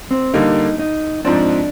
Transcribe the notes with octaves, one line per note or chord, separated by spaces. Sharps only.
C4
D3 G3 A#3 D#4
D#4
G#2 F3 C4 D4